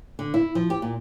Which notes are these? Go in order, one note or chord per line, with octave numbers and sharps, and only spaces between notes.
D3
E4
F3
G4
A#2